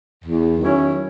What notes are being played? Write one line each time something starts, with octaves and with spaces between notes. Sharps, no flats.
E2
D#3 F#3 C#4 E4